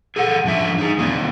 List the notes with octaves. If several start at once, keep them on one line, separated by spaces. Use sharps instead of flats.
G#4 A4 F#5
G#2 D3 F3 C#4 E5
D#4 G#4
D#3 A#3 C4 D5